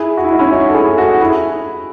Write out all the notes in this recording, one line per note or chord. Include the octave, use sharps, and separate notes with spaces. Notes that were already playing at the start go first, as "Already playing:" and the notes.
Already playing: E4 G#4
F#4
E4
D#4
C#4 E4
D#4 F#4
A4
E4 G#4
F#4 A4
E4 G#4